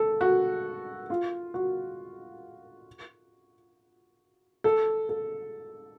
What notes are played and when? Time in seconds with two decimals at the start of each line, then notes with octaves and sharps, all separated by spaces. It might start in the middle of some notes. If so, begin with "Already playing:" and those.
Already playing: A4
0.21 F#4
1.10 F4
1.54 F#4
4.64 A4
5.09 A4